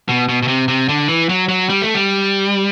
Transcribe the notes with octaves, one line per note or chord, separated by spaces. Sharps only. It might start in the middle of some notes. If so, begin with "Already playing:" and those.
B2
B2
B2
C3
C3
D3
E3
F#3
F#3
G3
A3
G3